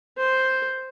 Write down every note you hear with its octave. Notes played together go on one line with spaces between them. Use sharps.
C5